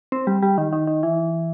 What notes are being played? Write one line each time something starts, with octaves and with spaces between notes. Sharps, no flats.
C4
G3
G3
D#3
D#3
D#3
E3